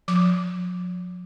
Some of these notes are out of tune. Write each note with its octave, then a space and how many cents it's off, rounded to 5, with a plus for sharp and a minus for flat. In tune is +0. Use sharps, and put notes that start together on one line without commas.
F3 +45 D6 +0